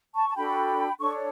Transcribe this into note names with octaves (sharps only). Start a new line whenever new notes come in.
A5 C#6
A5
D4 F#4 A4 G5 B5
D4 A4 C#5 C#6